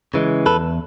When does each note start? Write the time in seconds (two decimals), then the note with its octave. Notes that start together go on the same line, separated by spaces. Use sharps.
0.14 C#3 E3 G#3
0.46 E2 A4 B4